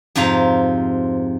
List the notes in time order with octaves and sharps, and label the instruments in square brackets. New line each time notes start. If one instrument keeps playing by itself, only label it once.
[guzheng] F2 G#2 C3 F4 F5 A#5